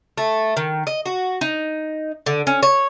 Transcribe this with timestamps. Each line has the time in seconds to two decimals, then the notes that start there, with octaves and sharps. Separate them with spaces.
0.18 A3
0.57 D#3
0.87 D#5
1.06 F#4
1.41 D#4
2.26 D3
2.47 C#4
2.62 C#5